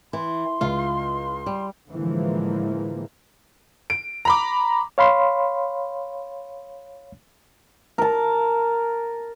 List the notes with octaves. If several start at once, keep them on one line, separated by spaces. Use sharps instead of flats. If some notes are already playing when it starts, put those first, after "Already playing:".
E3 C6
C#2 F4 F5
G3
A2 D3 E3 F3 G#3 A#3
D7
A#5 B5 D6
C#5 F5 B5 C6
A#4 A5